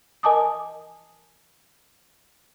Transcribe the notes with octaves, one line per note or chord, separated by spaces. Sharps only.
A#4 D#5 G#5 A5 D6 D#6